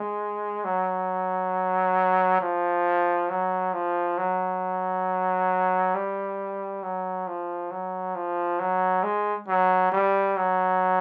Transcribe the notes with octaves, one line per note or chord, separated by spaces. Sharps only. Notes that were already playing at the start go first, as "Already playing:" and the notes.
Already playing: G#3
F#3
F3
F#3
F3
F#3
G3
F#3
F3
F#3
F3
F#3
G#3
F#3
G3
F#3